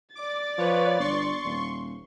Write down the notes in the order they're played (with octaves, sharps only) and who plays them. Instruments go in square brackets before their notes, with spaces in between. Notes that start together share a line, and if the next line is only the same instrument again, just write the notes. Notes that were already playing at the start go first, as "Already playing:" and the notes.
[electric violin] D5 A6 [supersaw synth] D6
[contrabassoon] F3 [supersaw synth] B4 C#5
[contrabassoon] G1 [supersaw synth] C6 C#6
[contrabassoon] D#1